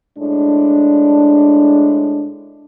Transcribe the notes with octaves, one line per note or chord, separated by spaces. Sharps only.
A2 G#3 D4